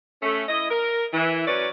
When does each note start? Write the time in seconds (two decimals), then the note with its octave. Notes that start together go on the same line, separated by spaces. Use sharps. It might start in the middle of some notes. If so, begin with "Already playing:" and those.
0.23 A3 C#4
0.49 E4 D#5
0.71 A#4
1.14 E3
1.47 F#3 C#4 F#4 B4 D5